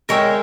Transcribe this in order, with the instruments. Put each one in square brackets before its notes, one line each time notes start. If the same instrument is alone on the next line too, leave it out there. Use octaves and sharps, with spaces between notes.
[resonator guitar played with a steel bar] G#3 [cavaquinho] A#4 C#5 E5 G5